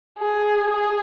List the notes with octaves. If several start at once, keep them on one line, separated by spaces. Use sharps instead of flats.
G#4
G#4